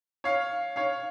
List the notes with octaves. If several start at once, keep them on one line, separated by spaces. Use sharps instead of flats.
C#5 F5
C#5 F5